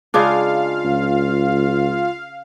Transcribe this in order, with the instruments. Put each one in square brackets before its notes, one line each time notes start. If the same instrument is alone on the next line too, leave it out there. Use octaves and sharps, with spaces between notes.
[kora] C#3 G#3 D4 [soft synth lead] F4 [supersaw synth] F5
[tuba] C#2